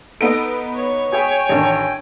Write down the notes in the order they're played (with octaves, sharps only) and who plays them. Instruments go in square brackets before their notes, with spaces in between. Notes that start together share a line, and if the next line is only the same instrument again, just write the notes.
[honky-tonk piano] B3 D#4 D7 [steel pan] A4 D#5
[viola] C#5
[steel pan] F#4 G#4 E5 [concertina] G5 G#5
[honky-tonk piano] A1 D#3 [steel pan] C#4 D4 A5